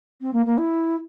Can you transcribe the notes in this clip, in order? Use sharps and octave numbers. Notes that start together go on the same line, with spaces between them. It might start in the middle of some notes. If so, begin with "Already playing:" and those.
C4
A#3
A#3
E4